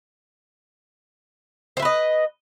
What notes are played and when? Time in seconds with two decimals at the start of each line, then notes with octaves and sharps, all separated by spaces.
1.77 C5
1.80 E5
1.82 B4
1.85 D#5